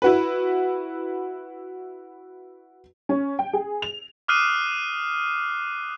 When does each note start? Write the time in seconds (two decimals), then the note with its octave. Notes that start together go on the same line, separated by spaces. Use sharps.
0.02 E4 F#4 B4
3.09 C#4
3.39 G5
3.53 G#4
3.82 F7
4.28 D6 D#6 F6 F#6 C7 D#7